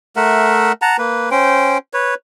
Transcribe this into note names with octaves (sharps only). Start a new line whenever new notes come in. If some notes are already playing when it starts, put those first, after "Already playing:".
A3 A#4 E5 F#5
F#5 A5 A#5
A#3 B4
C#4 C5 G5
B4 C#5